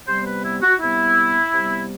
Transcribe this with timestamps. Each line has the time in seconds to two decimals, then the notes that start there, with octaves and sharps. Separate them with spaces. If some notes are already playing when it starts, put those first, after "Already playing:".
0.08 C3 G3 B3 C5
0.27 B4
0.44 E4
0.62 F#4
0.81 C3 G3 B3 E4
1.53 C3 G3 B3